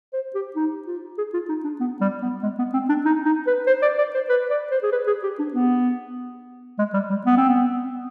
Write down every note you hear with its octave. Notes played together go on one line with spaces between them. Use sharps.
C5
G4
D#4
F4
G#4
F4
D#4
D4
B3
G3
B3
G#3
B3
C4
D4
D#4
D#4
B4
C5
D5
D5
C5
B4
D5
C5
G#4
B4
G#4
G4
D4
B3
G#3
G3
G3
B3
C4
B3